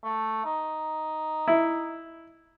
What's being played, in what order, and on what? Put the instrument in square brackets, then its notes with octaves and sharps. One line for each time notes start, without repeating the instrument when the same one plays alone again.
[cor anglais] A3
D#4
[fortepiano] E4